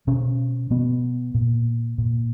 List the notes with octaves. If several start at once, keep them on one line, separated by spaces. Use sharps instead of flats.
B2 C#4
B2 B3
A#2
A#2